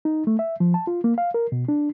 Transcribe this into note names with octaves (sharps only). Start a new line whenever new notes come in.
D#4
A3
E5
F3
A5
F4
A#3
F5
A#4
B2
D4